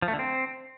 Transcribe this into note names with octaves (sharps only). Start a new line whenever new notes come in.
F3
A3
D3
C4